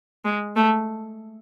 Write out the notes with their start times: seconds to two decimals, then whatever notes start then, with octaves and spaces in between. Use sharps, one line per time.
0.25 G#3
0.56 A3